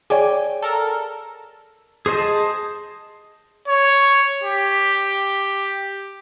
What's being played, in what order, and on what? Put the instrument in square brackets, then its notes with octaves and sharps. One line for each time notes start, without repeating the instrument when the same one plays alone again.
[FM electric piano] G#4 D5 [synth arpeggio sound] C#5 D6 [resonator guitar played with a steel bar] G5 G#5
[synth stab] A4 A#4
[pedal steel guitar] G#4 C5 D#5 A5
[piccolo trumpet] C#5
G4